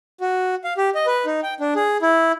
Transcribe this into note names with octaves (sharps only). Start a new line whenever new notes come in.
F#4
F5
G4
D#5
B4
D#4
G5
D4
G#4
E4